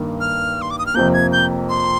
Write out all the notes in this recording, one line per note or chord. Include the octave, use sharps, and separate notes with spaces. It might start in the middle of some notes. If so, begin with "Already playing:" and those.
Already playing: G2 D#3 A#3
F6
C6
D6
D#6
F6
F2 C3 F3 A#3 G6
G#6
G6
C6